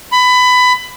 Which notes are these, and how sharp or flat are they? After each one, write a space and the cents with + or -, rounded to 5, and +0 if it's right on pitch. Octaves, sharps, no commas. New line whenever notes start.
B5 +20